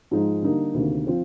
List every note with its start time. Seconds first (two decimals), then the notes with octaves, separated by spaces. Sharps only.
0.11 G#2 F3 G#3 D#4
0.42 D3 G3 A#3 D#4
0.74 D2 C3 D#3 A#3
1.06 F3 C4 F4